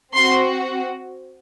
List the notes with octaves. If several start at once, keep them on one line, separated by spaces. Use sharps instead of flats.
C4 F#4 C6